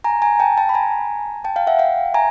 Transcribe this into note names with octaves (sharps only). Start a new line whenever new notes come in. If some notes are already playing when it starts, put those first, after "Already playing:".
G#5 A#5
G#5 A#5
G5 A5
G5 A5
B5
G#5 A#5
G5 A5
F5 G5
E5 F#5
F5 G5
G#5 A#5